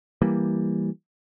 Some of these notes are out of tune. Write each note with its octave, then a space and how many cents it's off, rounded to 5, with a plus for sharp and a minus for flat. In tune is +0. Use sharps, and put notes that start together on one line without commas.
E3 +0 G3 +0 A#3 +0